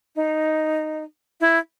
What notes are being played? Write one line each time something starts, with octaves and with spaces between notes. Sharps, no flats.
D#4
E4